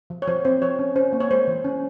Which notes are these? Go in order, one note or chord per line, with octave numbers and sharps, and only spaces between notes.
F3
C#5
F3 C5
C4 C5
F3 C#5
C#4
C#4 C5
A#3
C#5
G#3 C5
E3
C#4